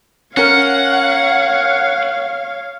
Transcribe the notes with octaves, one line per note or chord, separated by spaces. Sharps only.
C#4 A#4 C#5 F5 F#5